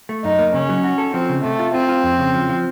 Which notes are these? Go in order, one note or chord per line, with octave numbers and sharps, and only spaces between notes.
A3
F#2 D#4
A#3
C#3 C#4
F#3
F#4
A4
F3 C4
C#3
C3 A3
F4
C4 F4
F4
F2
C#3
F3
F3